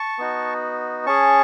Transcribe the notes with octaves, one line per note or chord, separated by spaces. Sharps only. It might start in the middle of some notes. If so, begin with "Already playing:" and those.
Already playing: A5 C#6
B3 D#4 F#4
C#4 G#4 A5 C#6